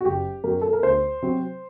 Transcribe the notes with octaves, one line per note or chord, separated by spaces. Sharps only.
F#4
F#1 G4
F#2 F#3 A#4
A4
A#4
D2 C5
C3 F#3 C4